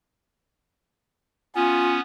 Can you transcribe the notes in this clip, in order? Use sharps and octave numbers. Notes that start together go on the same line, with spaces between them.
B3 C#4 F4 G#5